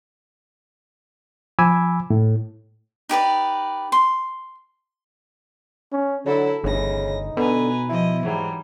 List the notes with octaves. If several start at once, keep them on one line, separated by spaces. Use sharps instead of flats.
F3 G#5 B5 D6 E6 G#6
A2
D#4 G4 B4 D5
C6
C#4
D3 F#3 E4 A4
G1 D2 C#3 E3 D#4 A#6
B2 D3 B4 G#5 A#5
F3 E4 D#5
G#2 E3 F#3 G3